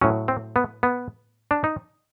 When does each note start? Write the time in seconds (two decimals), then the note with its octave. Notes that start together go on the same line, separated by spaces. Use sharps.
0.01 A2 F#3 C#4
0.28 C4
0.56 B3
0.83 B3
1.51 D4
1.64 D#4